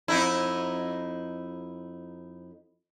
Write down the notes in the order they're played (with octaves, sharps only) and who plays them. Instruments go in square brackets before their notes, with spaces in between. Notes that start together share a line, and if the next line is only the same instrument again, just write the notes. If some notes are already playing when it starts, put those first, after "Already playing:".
[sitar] F2 D#4 E4